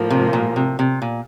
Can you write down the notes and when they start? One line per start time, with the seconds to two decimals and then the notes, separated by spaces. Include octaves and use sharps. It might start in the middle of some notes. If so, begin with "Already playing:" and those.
Already playing: A2 F3 A#3
0.10 C3
0.33 A#2
0.56 C3
0.79 C3
1.02 A#2